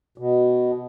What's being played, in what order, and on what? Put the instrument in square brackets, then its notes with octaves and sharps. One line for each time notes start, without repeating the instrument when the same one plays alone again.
[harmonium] B2